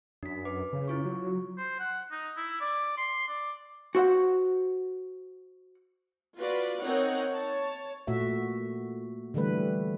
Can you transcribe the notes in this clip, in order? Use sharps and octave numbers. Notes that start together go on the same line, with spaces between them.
F#2 D4 B6
B4 D6
C#3
E4 F4 C#6
F#3
C5
F#5
D#4
E4
D5
C6
D5
F#4 C5 F#5
F4 F#4 B4 D5
C4 D#4 A#4 C#5 F#5
C#5 A5
A#2 A3 F#4 E5
D3 E3 G3 A3 B4